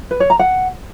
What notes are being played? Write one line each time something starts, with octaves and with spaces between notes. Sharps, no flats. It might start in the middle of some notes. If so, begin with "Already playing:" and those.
B4
C#5
A#5
F#5